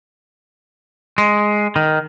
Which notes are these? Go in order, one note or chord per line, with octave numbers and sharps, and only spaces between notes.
G#3
D#3